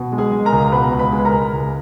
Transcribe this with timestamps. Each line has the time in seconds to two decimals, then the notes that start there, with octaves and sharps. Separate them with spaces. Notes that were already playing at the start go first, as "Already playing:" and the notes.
Already playing: B2
0.12 G#3
0.18 G#4 G#5
0.32 G#3
0.45 A#4 A#5
0.52 C#2
0.72 B2 B4 B5
0.92 C#2
0.99 B4 B5
1.12 G#3
1.25 A#4 A#5
1.33 G#3
1.52 C#2